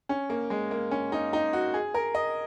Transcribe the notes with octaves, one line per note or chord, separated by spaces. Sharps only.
C#4
A#3
G#3
A#3
C#4
D#4
D#4
F#4
G#4
A#4
D#5